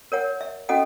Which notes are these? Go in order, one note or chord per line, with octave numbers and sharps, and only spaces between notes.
A#4 C#5 F#5
E5
C#4 F#4 A4 D#5 F#5